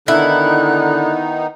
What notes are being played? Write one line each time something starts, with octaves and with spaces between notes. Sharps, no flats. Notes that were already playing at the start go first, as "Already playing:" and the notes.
D3 D#3 B3 D#4 E4 F#6